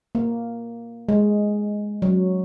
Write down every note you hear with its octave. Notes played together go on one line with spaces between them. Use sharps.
A#3
G#3
F#3